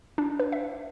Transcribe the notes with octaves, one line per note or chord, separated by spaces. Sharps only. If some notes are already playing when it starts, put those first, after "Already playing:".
D4
B4
E5